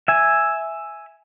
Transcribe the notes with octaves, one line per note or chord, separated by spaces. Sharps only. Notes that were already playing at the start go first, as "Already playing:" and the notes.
E5 G#5